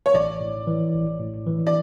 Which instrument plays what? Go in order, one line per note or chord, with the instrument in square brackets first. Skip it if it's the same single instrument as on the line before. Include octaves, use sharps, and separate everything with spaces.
[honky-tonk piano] C#5
[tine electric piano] A1 [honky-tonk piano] D5
[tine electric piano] A2
E3
A1
A2
E3
[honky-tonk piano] D5